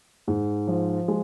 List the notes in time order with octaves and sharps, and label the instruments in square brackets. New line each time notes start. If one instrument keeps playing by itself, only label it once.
[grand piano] G#2
F3
G#3